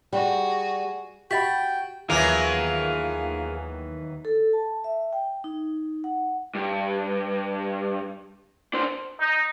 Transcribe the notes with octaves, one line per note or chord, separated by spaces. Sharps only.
G3 F#4 G#4
F#4 G4 F5 G5 B5 A6 B6
D#2 D#3 E3 F#3 B3 F4 G#4 A#4
A4
A5
E5
G5
D#4
F#5
G2
D4 C5
D#4